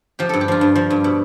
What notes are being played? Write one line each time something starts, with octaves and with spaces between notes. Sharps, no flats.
F3 G4
G2 A4
G4
F3 F4
G2
F3
G2
B2